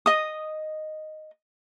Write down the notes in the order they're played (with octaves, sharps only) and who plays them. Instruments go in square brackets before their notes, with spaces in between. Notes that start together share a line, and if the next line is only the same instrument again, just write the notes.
[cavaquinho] D#5 D#6